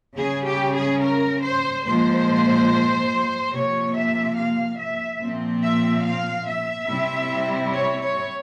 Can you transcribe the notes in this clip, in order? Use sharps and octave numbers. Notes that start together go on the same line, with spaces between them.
C#3 G3 C#4 G#4
G4
G#4
A#4
C5
A#2 F3 G#3 C5
C3 F3 A#3 C#5
E5
F5
E5
A#2 F3 C4
E5
F5
E5
C3 G3 C4 E4
C#5
C#5